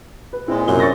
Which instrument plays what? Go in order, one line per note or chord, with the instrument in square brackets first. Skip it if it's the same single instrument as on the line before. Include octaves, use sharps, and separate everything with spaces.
[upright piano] B4
[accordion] A#2 G#3 [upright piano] C4 E4
[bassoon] F#2 [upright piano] C3 G7
[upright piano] C#6 A6 A#6